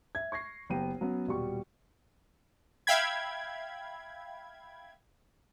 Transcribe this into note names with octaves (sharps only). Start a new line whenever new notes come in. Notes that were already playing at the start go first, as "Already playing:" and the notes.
E5 G#6
C#6 G#6 A#6 C7
F#1 B3 G4 G5 D#7
F#3 B3 C#4
D#1 B2 G3 C#6
E5 F5 G5 B5 G#6